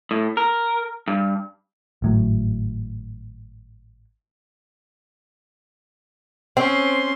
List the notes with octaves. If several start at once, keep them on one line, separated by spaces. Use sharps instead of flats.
A2
A#4
G2
G#1 A2 F#3
C4 C#4 C6